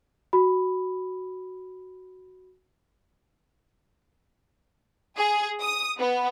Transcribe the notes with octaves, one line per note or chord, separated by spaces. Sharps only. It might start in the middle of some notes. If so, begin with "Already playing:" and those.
F#4 B5
G#4
D#6
B3